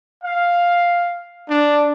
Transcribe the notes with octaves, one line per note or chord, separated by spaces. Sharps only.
F5
D4